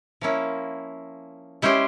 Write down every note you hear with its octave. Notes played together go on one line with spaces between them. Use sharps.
F3 A#3 C#4 E4
G#3 C#4 E4 G4 C5